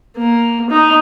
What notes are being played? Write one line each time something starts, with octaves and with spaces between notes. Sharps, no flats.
A#3
D#4